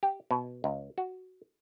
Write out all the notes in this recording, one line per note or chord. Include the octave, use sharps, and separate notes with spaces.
G4
B2
C#2
F#4